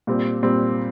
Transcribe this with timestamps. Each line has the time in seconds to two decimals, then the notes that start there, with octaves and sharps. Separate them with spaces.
0.07 A#2 G3 C4
0.43 A#2 G3 C4